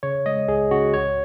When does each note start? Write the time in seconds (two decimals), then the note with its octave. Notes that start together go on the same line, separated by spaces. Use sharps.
0.03 C#3 C#5
0.26 G#3 D#5
0.48 C#2 G#4
0.71 C#3 F#4
0.94 C#2 C#5